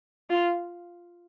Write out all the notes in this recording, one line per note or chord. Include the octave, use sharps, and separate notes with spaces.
F4